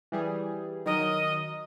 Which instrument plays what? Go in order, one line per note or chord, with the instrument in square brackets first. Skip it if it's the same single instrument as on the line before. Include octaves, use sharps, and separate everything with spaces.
[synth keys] E3 G3 G#4
[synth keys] D#3 F#3 A#4 [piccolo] D#5